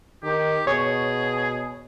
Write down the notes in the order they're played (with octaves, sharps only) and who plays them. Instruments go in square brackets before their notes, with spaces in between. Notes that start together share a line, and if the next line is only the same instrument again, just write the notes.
[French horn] D#3 [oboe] G4
[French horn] B2 [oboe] G#4 [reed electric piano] C#5